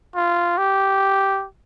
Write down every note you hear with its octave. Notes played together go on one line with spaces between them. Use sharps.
F4
G4